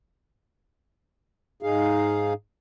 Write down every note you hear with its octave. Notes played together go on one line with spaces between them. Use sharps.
G#2 D#4 G#4 F5